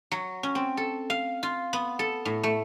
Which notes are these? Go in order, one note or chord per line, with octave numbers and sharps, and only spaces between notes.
F#3
C#4
C4
A4
F5
F4
B3
A4
A2
A3